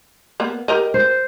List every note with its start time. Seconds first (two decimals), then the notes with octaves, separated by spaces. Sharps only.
0.40 A#3 B3
0.68 G4 A#4 D#5
0.94 C5